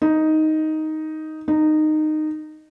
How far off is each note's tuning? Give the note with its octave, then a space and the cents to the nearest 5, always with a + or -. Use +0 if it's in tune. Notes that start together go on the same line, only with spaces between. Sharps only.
D#4 +5
D#4 -15